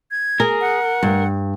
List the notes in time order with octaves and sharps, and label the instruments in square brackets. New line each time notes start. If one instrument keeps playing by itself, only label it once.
[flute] G#6
[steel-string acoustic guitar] G#4 [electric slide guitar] A#4
[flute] F#5
[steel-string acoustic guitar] G2